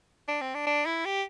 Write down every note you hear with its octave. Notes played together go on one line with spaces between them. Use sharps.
D4
C4
D4
D4
E4
G4